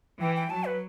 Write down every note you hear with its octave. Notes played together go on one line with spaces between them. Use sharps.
E3 G5
G5
F#3 A5
B4